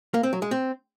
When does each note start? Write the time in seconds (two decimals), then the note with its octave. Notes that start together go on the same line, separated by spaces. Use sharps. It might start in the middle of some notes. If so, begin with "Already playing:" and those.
0.14 A#3
0.23 C4
0.33 F#3
0.42 G#3
0.51 C4